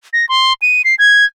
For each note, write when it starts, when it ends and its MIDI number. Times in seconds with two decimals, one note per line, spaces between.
0.13 0.26 94
0.29 0.53 84
0.62 0.82 99
0.84 0.95 96
0.99 1.25 92